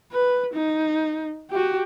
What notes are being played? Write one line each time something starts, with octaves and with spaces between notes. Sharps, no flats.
B4
D#4
F#4 G4